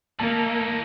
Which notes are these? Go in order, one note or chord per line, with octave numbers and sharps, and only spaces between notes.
E3 A#3 D#4 A5